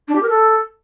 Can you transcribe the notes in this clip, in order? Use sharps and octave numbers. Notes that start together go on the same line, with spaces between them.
D4
G4
A#4
A4